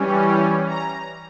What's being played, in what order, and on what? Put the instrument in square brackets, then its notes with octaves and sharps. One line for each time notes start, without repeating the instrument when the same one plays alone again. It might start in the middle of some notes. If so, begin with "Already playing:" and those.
Already playing: [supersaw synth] E3 G3 C#4
A#5